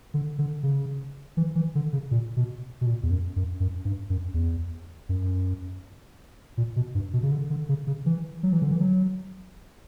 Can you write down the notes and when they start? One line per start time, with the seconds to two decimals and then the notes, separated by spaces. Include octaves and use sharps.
0.14 D3
0.39 D3
0.63 C#3
1.37 E3
1.55 E3
1.75 D3
1.93 C#3
2.11 A#2
2.37 B2
2.81 B2
2.87 A#2
3.03 E2
3.11 F#2
3.36 F#2
3.60 F#2
3.85 G2
4.10 F#2
4.34 E2
5.09 F#2
6.57 A#2
6.76 B2
6.95 G2
7.13 B2
7.23 C#3
7.31 D3
7.50 D3
7.69 C#3
7.87 C#3
8.06 E3
8.43 F#3
8.53 E3
8.62 D3
8.71 E3
8.80 F#3